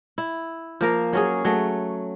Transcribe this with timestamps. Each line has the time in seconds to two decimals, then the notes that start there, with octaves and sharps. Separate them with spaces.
0.18 E4
0.81 F3 A#3 A#4
1.13 F#3 C#4 G#4
1.45 F#3 A3